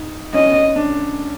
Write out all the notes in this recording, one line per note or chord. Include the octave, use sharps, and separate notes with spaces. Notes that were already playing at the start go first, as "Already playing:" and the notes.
Already playing: D#4
C#4 D#5
D4